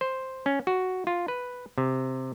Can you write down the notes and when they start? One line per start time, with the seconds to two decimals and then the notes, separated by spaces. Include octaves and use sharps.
0.01 C5
0.46 C#4
0.67 F#4
1.07 F4
1.28 B4
1.78 C3